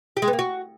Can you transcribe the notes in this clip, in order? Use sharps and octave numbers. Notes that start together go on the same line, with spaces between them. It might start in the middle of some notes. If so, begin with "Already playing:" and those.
G4
G#3
B3
A#3
F#4